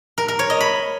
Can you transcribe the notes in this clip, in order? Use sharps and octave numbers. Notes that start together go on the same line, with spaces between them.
A#4
A#4
C#5
D#5
B5